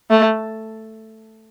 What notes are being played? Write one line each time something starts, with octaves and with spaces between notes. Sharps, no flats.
A3